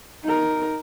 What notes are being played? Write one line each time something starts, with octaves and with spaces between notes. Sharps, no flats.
D#4 A#4